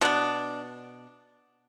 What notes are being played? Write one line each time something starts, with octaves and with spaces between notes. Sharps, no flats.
B2 B3 D4